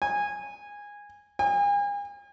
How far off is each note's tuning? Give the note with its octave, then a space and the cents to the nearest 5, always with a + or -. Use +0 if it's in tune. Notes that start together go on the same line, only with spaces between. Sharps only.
G#5 -15
G#5 -40